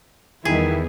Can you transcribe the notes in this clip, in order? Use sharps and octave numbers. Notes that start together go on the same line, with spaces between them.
E2 D#3 G3 B3 E4 G#4